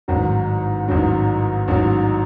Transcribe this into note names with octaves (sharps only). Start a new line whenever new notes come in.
A1 G#2 D#3 F#3
A1 G#2 D#3 F#3
A1 G#2 D#3 F#3